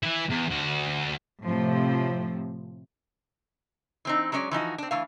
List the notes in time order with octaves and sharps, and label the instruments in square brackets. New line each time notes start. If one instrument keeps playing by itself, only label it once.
[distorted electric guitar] E3 E4
E2
D2 F#4
[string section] A2 C3 F3
[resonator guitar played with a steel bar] E3 C4 D#4
F#3 G#3 C#4 C#5 D5
E3 F3 D#4 F#4
C4 D4
E3 A3 F5